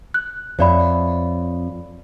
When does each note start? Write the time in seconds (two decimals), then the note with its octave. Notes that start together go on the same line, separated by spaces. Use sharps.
0.14 F#6
0.59 F2 C#5 D5 E5 B5